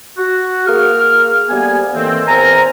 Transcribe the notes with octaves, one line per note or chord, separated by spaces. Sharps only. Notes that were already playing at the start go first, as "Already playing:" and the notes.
F#4
A#3 G#4 F6
D2 G3 A#3 B3 G#5
A2 D#3 E3 A#3 C4
E2 C4 A#4 G#5 A#5